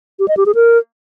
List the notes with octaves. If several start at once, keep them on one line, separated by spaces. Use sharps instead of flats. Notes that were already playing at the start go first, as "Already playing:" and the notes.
G4
D#5
G4
G#4
A#4